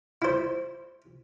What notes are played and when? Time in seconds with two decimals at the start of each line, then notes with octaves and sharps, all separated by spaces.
0.22 E4 C5